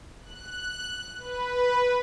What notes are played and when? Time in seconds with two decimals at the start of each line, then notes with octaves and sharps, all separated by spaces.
0.22 F#6
1.18 B4